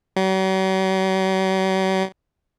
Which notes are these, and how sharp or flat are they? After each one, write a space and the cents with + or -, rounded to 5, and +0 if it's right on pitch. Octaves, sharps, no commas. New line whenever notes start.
F#3 +45